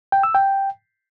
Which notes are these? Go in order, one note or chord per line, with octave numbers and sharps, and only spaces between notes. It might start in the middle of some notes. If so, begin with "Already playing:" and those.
G5
E6
G5